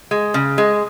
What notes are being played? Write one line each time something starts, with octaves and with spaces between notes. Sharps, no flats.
G#3
C#3
G#3